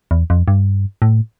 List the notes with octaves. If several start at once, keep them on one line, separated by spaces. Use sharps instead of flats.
E2
F2
G2
A2